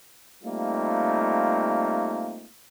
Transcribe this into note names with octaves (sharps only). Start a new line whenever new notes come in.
G3 A3 A#3 C4 D#4 F4